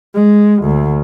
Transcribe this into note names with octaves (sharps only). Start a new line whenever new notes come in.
G#3
D2